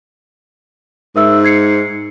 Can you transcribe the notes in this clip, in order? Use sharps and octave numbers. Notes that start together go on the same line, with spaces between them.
G#2 A#4 E5 E6
G#6 C7 C#7